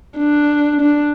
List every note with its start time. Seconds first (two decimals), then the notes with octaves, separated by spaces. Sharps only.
0.18 D4
0.81 D4